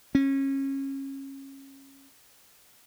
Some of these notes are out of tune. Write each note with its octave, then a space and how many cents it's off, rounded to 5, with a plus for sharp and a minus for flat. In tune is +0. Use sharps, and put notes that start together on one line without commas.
C#4 -25